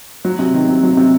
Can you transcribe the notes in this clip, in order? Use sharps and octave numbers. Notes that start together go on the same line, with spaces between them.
F#3
C3
D#3
C3
F#3
C3